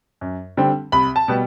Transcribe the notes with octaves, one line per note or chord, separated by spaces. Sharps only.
F#2
D3 G3 C4
C2 B5
A5
B2 G3 B3